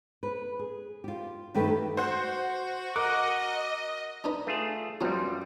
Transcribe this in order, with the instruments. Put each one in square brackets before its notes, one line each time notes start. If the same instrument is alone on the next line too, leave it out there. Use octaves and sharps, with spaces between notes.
[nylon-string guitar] B4
G#4
F4 G4
G2 D#3 A3 G4 A4 B4
[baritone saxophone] F#4 [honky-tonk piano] C5 F#5
[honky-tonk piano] A#4 [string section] D#5 [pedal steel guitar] F#5 D6
[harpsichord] D4 D#4 B4
[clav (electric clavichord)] A3 F4 G#4
[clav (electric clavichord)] F#2 G3 [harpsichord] F#3 B3 C4 [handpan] F4